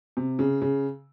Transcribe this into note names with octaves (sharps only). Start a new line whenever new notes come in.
C3
C#3
C#3